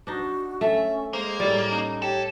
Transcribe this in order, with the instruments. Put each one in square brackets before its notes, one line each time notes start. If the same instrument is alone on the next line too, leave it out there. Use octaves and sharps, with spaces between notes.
[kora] D4 D#4 [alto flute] F#4
[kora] A3 [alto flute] C#4 [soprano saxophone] E5
[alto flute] G#3 [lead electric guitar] A#3 [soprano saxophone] C5
[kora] A2 G3 [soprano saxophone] D5
[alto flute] C#4 [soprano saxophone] D#4
[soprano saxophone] G4 [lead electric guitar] A4 [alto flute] C#5